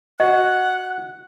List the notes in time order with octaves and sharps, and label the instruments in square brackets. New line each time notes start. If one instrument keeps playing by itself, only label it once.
[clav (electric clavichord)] F#4 [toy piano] D#5 [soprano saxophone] F#5 [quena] F#6